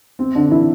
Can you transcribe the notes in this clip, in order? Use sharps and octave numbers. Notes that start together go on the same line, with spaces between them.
C4
D3 D4
E3 E4